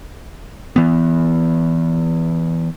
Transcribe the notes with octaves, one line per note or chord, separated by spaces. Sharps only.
E3 B3